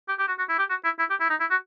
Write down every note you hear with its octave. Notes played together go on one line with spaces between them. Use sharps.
G4
G4
F#4
F#4
E4
G4
F#4
E4
E4
G4
E4
D#4
E4
F#4